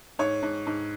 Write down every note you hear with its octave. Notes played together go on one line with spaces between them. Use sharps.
G#2 C#5
G#2
G#2